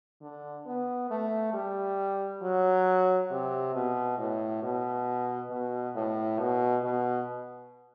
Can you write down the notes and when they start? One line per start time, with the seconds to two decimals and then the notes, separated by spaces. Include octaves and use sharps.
0.21 D3
0.66 B3
1.10 A3
1.54 G3
2.42 F#3
3.31 C3
3.74 B2
4.18 A2
4.62 B2
5.50 B2
5.96 A2
6.39 B2
6.83 B2